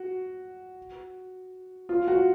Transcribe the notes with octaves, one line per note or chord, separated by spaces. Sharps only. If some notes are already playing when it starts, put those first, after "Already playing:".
Already playing: F#4
F4
F#4